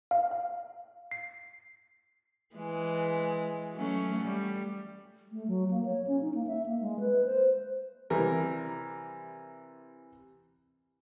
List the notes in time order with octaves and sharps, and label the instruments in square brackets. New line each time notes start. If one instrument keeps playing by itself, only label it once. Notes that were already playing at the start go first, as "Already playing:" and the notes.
[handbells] F5
F5
C7
[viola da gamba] E3 G#3
F#3 A3 C#4
G3
[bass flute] A3
F#3
A#3
C#5
C#4
D#4
A#3
E5
A#3
G#3
B4
C5
[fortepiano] C3 E3 G3 A#4